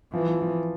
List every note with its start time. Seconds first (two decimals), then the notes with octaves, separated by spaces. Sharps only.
0.13 E3 F3
0.28 F3
0.41 F3